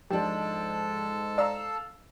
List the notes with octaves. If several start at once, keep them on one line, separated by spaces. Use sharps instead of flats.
G#2 F3 G#3 D4 G4 A4 A5
D5 F5 A#5 E6